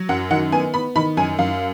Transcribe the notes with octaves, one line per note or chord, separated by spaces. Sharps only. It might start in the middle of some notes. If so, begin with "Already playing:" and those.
Already playing: F#3
F#2 F#5
D#3 F#5
B3 G#5
B3 B5
D#3 B5
F#2 G#5
F#2 F5